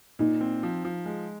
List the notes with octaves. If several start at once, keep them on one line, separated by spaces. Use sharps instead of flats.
A#2 D#4
C4
F3
F3
G#3